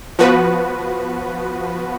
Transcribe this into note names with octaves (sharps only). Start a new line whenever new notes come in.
F3 B3 F#4 B4